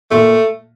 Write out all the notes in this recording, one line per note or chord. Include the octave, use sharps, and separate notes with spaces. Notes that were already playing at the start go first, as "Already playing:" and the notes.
A#2 A3